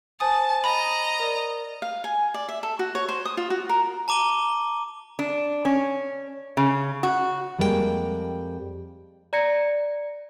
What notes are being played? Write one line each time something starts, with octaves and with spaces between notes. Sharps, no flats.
C5 G#5 A5 D#6
D#5 A#5 B5
A#4 D5
F5
G#5
D5
E5
A4
F#4
C#5
C5
D#6
F4
F#4
A#4
A5 A#5 D6 D#7 G7
D4
C#4
C#3
F#4
F2 G3 G#3 A#3 G#4 G5
D5 A#5 G#6 A#6 C#7